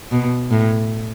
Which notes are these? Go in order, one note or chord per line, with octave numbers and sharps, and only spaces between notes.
B2
A2